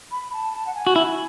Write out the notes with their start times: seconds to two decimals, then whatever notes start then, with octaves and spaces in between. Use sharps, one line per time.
0.12 B5
0.33 A5
0.53 A5
0.67 F#5
0.75 G#5
0.87 F#4
0.96 E4